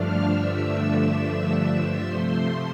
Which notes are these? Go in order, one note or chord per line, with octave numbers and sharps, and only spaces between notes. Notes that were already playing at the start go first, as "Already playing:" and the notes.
Already playing: G2 D3 F3 A3 D4 F5 F6
E5 E6
C3 F3 A3 C5 C6